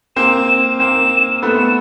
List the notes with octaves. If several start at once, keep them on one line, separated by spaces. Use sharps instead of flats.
A#3 C4 E7
A#3 C4 E7
A3 B3
E7